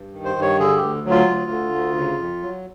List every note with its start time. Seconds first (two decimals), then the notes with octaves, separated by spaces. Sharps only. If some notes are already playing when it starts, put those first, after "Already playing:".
Already playing: G2
0.13 D#3
0.25 C5
0.36 G2
0.42 C#5
0.59 D3 G#4
0.77 G4
0.82 D2
1.05 F#3
1.10 F4
1.28 D2
1.51 D3
1.74 D2
1.97 C#3
2.20 F2
2.43 F#3